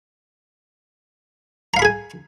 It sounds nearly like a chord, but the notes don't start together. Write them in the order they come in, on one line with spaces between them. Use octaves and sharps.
A#5 F5 B5 G#4 G#5